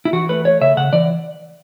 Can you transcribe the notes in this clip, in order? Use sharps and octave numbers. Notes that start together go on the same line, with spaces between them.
E4
E3 F#4
A3 B4
A3 C#5
C#3 E5
C#3 F#5
E3 D5